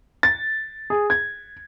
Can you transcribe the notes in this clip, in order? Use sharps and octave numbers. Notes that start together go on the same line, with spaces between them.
A6
G#4
G#6